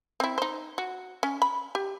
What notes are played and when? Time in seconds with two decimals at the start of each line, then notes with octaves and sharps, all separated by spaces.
0.20 C4 E4
0.38 D#4 C5
0.78 F#4
1.23 C#4
1.42 B5
1.75 G4